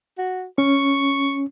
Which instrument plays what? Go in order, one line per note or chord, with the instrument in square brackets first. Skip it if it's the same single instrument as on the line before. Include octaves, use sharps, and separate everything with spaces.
[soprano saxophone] F#4
[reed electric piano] C#4 [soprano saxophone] C#6